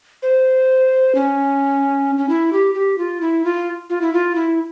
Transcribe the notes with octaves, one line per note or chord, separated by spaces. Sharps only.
C5
C#4
C#4
E4
G4
G4
F4
E4
F4
F4
E4
F4
E4